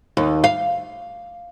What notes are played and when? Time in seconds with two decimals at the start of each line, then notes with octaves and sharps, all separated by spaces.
0.17 D#2
0.44 F5